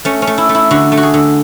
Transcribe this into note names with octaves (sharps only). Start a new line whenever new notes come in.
A3 C#4
C#4
A3
E4
A3
E4
D3 F#4
A3
F#4
G#4
D3